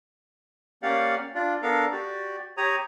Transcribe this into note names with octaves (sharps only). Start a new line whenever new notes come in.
A#3 C#4 G4 D5 F5 F#5
D4 F4 D5
B3 D4 A4 A#4 F5
F#4 G4 D5
G4 C#5 A#5 D#6